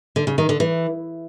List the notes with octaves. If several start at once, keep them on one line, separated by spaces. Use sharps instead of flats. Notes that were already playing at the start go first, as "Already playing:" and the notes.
D3
C#3
D#3
D3
E3